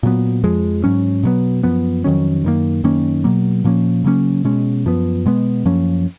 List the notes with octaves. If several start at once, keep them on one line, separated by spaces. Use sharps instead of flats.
A#2 F#3 B3
F2 F3 G#3
G#2 F#3 C#4
B2 F#3 B3
F#2 F3 B3
F2 D#3 F#3 C#4
F#2 D#3 A#3
F#2 D#3 A#3 C#4
B2 F#3 A#3
A#2 F3 A#3 C#4
C#3 F#3 A#3 C#4
B2 G#3 C#4
F#2 F3 B3
B2 G#3 B3
F#2 F3 A#3 C#4